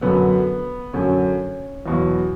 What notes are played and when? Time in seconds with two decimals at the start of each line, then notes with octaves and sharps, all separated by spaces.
0.01 F#2 D3 F#3 B3
0.93 F#2 D3 F#3 C#4
1.86 E2 B2 F#3